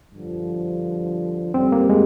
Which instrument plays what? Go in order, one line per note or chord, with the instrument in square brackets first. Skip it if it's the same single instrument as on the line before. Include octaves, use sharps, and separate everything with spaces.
[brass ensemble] G2 D3 F3
[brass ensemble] G2 D3 G3 [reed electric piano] C4
[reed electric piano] A#3
G#3